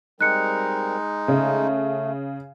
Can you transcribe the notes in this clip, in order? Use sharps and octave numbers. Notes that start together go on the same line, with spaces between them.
G3 G#3 C4 D#4 A#4 F#6 C#7
C#3 A3